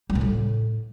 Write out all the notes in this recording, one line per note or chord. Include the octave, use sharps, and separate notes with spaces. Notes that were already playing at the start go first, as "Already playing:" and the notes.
G3
B2
A2